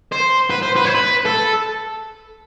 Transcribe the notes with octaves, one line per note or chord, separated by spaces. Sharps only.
C5
B4
C5
B4
C5
B4
A4